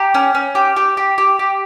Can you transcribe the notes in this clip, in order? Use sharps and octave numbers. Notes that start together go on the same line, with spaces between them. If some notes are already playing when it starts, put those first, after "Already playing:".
Already playing: G4 A#5
C#4
C#4
G4
G4
G4
G4
G4